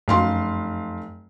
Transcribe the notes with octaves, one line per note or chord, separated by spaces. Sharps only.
F1 F#2 F5 C6